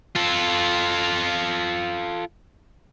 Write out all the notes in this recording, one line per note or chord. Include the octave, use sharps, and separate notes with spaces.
F4 A4